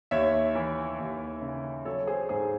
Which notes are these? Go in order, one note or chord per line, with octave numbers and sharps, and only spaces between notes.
D#2 C#5 E5
E3
D#2
C#3
F#3 A4 C#5
G#4 C5
G#2 G#4 C5